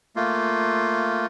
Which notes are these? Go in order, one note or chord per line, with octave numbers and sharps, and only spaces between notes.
A3 A#3 F4